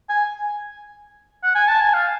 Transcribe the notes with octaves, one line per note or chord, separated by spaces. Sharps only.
G#5
F#5
G#5
A5
G#5
F5